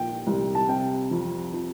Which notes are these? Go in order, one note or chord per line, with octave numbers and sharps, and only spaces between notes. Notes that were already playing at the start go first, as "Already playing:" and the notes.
Already playing: A#2 F3 G5
C2
A5
C3 G5
F2
F3